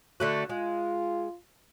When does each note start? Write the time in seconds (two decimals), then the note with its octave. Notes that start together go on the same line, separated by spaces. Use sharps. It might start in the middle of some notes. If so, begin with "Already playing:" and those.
0.20 D3 A3 F#4
0.49 G#3 F4